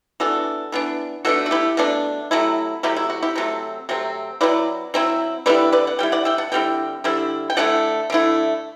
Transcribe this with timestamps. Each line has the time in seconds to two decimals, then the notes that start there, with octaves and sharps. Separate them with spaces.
0.20 E3 B3 D4 F#4 A4
0.72 E3 B3 D4
1.25 B2 A3 D4 F#4 A4
1.46 F#4
1.51 E4 G4
1.77 B2 A3 D4
2.31 C3 F#3 A3 E4
2.83 C3 F#3 A3 E4 G4
2.96 E4
3.10 F#4
3.23 E4 G4
3.36 C3 F#3 A3 C4 A4
3.89 C3 F#3 A3 C4
4.41 F#3 C4 E4 B4 D5
4.94 F#3 C4 E4
5.46 D3 G3 C4 E4 B4 D5
5.72 B4 D5
5.87 F#5
5.99 D3 G3 E4 G5
6.12 D5 F#5
6.25 E5 G5
6.38 F#5 A5
6.52 D3 G3 C4 E4 G5
7.04 D3 G3 C4 E4
7.50 G5
7.57 D3 A3 E4 D5 F#5
8.10 D3 A3 E4